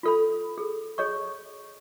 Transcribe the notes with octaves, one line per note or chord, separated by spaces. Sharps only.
F4 A4 B5
G#4 A4
G#4 C#5 D#5 C#6